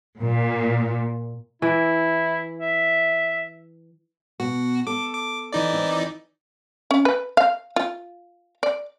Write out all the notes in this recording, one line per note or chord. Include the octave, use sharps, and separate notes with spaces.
A#2
E3 E4
E5
B2 B3 F#4
A4 D6
D6
E3 D#4 D5
C4 E4
C#4
B4
F5
F4
D5